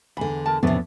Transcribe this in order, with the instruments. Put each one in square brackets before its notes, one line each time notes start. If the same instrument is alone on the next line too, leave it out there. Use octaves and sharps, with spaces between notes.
[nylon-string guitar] E2 D3 [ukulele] B5
[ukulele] A#4 A5
[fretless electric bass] E2 F3 B3 [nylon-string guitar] A2 C3 [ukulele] C#4 D4 A4